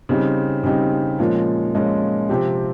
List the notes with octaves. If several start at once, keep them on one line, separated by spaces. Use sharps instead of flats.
C#3 G3 C4 D#4
C#3 G3 C4 D#4
A#2 F3 G#3 C#4
A#2 F3 G#3 C#4
C3 F3 C4 G4